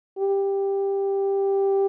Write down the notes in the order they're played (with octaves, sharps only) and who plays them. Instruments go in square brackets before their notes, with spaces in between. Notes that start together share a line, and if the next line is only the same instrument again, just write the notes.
[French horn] G4